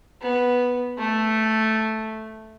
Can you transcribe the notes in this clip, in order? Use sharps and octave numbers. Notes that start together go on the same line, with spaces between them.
B3
A3